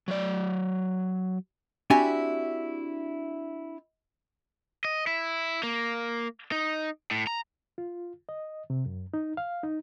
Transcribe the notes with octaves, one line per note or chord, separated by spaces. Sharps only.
F#3 D5
C4 D4 E4 F#4 G4 G#5
D#5
E4
A#3
D#4
A2
A#5
F4
D#5
C3
F#2
D#4
F5
D#4